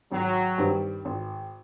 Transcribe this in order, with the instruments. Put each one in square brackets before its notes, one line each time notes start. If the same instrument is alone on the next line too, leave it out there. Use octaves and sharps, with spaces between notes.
[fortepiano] G#1 [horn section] F#3
[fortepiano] G2 D#3 G3 C4
G#1